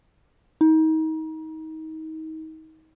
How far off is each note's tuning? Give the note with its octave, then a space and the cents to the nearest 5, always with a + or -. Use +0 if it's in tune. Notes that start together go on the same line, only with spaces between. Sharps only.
D#4 +30